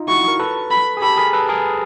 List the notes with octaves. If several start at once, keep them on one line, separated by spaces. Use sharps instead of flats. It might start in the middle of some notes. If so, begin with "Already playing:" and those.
Already playing: D#4 F4
E4 F#4 C#6
A#4
A4 B4
B5
G#4
G4 A4 B5
G#4 A#4
A4 B4
G#4 A#4